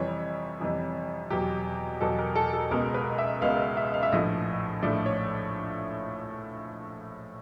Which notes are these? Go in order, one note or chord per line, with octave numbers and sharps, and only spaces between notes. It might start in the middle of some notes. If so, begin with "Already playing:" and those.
Already playing: F2 C3 E3 G3 C#5
F2 C3 E3 G3
E2 B2 F#3 G4
E2 B2 F#3 A4
A#4
A4
A4
C#2 B2 G#3 B3 A#4
B4
E5
C#2 B2 G#3 B3 F5
E5
F5
E5
A#1 A2 F3 A3 D#5
A#1 A2 F3 A3 D5
C#5